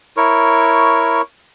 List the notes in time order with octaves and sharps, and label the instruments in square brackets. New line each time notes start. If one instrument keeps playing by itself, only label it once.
[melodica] E4 A#4 C#5 C#6